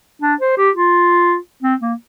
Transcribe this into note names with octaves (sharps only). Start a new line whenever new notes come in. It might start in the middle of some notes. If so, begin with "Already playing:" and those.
D4
C5
G4
F4
C4
A#3